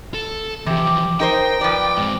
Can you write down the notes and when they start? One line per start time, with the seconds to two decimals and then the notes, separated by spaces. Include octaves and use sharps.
0.14 A4
0.66 C3 E3 F3 G4
1.20 D#4 A#4 C5 G5
1.61 F3 B4 D5
1.97 G#2 C4